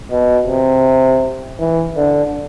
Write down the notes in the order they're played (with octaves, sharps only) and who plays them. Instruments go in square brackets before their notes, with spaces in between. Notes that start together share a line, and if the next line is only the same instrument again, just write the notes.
[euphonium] B2
C3
E3
D3